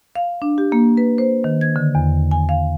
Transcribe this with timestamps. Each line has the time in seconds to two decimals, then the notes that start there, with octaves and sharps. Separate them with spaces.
0.16 F5
0.42 D4
0.58 G4
0.72 A#3
0.97 B4
1.18 C5
1.44 D#3
1.61 G#6
1.76 D3
1.95 E2
2.31 G#5
2.49 F5